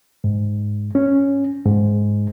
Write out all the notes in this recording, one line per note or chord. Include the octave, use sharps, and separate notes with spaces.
G#2
C#4
G#2